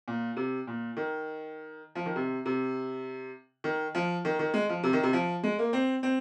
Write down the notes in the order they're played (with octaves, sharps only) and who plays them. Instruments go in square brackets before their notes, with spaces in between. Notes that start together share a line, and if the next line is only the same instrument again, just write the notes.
[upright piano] A#2
C3
A#2
D#3
F3
D#3
C3
C3
D#3
F3
D#3
D#3
G#3
F3
C3
D#3
C3
F3
G#3
A#3
C4
C4